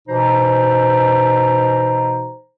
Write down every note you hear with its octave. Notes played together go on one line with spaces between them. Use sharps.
B2 E3 D#4 C5 A#5